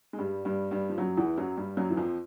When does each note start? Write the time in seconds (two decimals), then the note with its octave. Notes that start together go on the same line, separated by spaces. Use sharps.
0.13 G#3
0.18 G2 G3
0.45 G2 G3
0.71 G2 G3
0.89 F3
0.98 F#2 F#3
1.17 E2 E3
1.38 F#2 F#3
1.57 G2 G3
1.77 F#2 F#3
1.90 E3
1.97 F2 F3